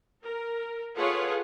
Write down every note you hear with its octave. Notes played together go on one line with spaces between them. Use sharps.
A#4
F4 G#4 A4 B4 C#5 F#5